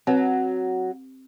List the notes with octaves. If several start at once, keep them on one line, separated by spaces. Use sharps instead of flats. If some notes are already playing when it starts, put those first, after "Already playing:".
F#3 C4 B4